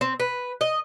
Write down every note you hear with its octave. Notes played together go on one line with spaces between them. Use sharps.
C4
B4
D#5